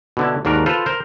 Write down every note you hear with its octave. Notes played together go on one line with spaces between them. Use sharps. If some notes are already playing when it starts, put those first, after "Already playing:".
B2 D3 E4
D#2 G#2 D4 F#4 A#4
F4 A4 B4 C5
A#4 C5